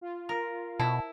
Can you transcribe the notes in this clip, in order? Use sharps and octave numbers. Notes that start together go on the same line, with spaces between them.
F4
A#4
B2 E4 A5